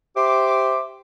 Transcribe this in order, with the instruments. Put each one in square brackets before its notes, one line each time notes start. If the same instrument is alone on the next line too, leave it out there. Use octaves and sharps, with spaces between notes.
[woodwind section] G4 C5 E5 C6 D6